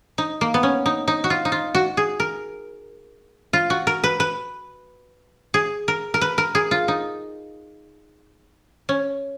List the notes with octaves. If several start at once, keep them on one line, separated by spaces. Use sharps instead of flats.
D#4
A#3
B3
C#4
D#4
D#4
F#4
F4
D#4
F4
F#4
G#4
A#4
F4
F#4
A#4
B4
B4
G#4
A#4
A#4
B4
A#4
G#4
F4
D#4
C#4